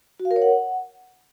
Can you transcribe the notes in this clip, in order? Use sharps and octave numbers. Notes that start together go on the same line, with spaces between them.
F#4
F5
A#4
C#5
F#5